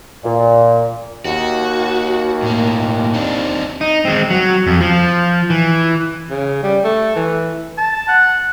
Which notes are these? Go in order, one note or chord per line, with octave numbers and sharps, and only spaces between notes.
A#2
D#2 F#4
A2 A#3
C4 D4 D#4
D#4
G#3 C4
F#3
F2
F3
E3
C#3
G3
A3
E3
A5
F#5